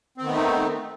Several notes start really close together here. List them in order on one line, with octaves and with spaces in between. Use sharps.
C4 D#3 B3 A3 D#4